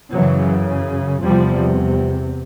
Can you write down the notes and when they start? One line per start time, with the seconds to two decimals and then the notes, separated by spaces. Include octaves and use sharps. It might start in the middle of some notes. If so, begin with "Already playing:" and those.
0.13 F#2 C#3 E3 F#3
1.24 E2 C3 F3 G3